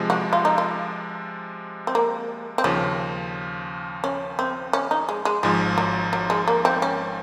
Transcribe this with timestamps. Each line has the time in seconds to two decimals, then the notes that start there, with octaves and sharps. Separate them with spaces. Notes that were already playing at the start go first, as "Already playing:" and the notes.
Already playing: C3 F3 G#3
0.10 F#4
0.33 F4
0.45 D#4
0.58 F4
1.87 C4
1.95 A#3
2.58 C4
2.64 D#2 C#3 F3 C#4
4.04 C#4
4.39 C4
4.73 C#4
4.91 D#4
5.09 G#3
5.25 G#3
5.43 G#1 G#2 F3 G#3
5.78 F#3
6.13 F#3
6.30 G#3
6.48 A#3
6.65 C4
6.82 C#4